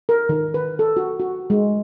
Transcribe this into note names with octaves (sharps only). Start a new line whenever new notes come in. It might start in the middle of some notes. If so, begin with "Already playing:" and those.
A#4
D#3
B4
A4
F#4
F#4
G#3